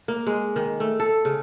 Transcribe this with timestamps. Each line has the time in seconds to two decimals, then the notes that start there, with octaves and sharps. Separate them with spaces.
0.08 A#3
0.27 G#3
0.56 D#3
0.80 A3
1.00 A4
1.25 C#3